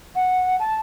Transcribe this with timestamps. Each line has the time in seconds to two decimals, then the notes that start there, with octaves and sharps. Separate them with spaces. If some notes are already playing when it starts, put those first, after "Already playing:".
0.16 F#5
0.59 A5